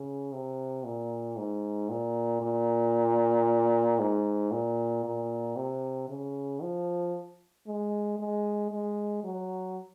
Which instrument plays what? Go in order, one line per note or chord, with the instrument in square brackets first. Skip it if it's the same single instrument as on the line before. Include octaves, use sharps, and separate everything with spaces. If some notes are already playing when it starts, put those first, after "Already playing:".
Already playing: [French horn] C#3
C3
A#2
G#2
A#2
A#2
G#2
A#2
A#2
C3
C#3
F3
G#3
G#3
G#3
F#3